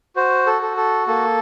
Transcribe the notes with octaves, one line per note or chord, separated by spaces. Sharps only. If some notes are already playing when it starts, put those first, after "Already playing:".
F#4 C5
A4
A4
A4
A#3 A4